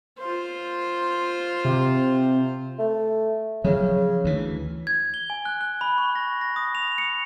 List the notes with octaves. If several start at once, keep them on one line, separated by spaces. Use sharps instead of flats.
F4 C5
C3
A3
C#3 F3 F#3
D2 E3
G#6
G7
G#5
F#6
F#6
B5
C#6
A#6
A#6
D#6
F7
C#7